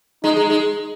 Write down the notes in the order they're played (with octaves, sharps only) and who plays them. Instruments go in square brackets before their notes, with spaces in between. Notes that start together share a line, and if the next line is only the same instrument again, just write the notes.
[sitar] G#3 [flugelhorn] D#4
[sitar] G#3
G#3